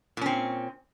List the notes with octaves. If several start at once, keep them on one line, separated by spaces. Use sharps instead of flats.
A#2 C4 C#4